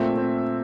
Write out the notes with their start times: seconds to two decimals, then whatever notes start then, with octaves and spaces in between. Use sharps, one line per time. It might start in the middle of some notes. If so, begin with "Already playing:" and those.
Already playing: A#2 A3 C4 E5
0.18 C4